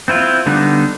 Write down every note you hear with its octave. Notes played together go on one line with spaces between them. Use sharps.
C4 E4 F4
D3 G3 B3 D#4